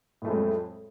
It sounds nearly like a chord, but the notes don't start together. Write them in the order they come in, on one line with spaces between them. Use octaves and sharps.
A2 A3 F2 G#3 F#3